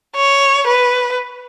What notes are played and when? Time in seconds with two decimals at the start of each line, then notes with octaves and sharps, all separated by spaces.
0.16 C#5
0.67 B4